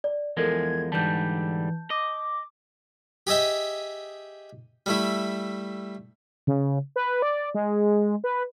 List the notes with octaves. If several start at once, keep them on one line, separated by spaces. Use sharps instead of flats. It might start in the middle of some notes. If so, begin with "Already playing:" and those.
D5
E2 F3 G#3 A4 A#4 G#6
G#2 D3 E3 G3 A5 G6
D#5 D6
G4 G#4 D#5 E5 G5
G3 A3 E4
C#3
B4
D5
G#3
B4